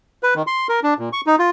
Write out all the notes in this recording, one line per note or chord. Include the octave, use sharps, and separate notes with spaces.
B4
D#3
C6
A#4
D4
A#2
C#6
D#4
F4